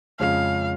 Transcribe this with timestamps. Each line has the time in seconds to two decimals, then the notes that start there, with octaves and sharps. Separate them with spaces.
0.19 F2 C#3 G#3 C#4 F5